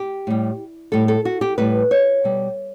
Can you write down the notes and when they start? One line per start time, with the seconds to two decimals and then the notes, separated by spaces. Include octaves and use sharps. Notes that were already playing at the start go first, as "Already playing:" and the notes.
Already playing: G4
0.27 A2 G3
0.92 A2 G3 A4
1.08 A4
1.25 F#4
1.41 G4
1.58 A2 G3 B4
1.91 C#5
2.24 B2 G3